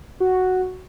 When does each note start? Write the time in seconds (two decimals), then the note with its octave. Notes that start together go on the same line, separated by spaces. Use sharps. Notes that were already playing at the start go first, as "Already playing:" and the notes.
0.20 F#4